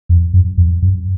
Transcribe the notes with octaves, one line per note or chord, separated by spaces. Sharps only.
F2
F#2
F2
F#2